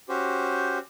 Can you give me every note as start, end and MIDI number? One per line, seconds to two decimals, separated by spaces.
0.09 0.79 61
0.09 0.79 66
0.09 0.79 67
0.09 0.79 72